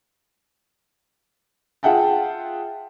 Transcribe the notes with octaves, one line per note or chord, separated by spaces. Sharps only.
F4 G#4 E5 F#5 G5 A5